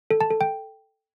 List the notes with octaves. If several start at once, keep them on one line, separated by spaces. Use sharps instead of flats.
A4
A5
A4
G5